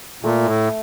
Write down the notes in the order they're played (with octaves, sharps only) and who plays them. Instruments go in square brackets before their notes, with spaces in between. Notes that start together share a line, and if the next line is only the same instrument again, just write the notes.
[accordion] A#2 [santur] A3
[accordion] A2